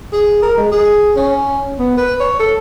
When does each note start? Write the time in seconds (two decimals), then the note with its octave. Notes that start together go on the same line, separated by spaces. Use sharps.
0.12 G#4
0.43 A#4
0.57 G#3
0.72 G#4
1.16 C#4
1.78 B3
1.97 B4
2.20 C#5
2.40 A4